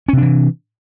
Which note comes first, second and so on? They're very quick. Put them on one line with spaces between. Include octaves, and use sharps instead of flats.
C#4 C3 D4 E3